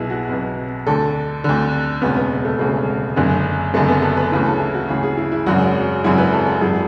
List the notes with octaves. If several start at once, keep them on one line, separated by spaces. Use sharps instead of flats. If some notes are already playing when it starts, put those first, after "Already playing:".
Already playing: B1 B2 E4 G#4
F#4
B1 B2
D2 D3 A4
D2 D3
E1 D2 C#3 B3
B3
A3
E1 D2 C#3 G#3
F#1 F#2 D3
F#1 F#2 D3 A3
B3
A4
B4
D2 C#3 E3 B4
A4
E4
F#4
D2 C#3 E3 G#4
G#4
E4
E4
G#1 F#2 C#3 F#4
G#1 F#2 C#3 E4
B4
A4
A4
G#1 F#2 E3 G#4